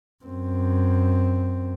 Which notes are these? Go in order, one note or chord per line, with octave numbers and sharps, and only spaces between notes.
F#2 C4